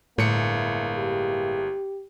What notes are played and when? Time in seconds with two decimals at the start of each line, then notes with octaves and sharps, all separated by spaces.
0.18 G1 A2 G#3 A#3 E4 C#7
0.97 G4